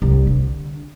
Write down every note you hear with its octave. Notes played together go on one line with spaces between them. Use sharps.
C2
D3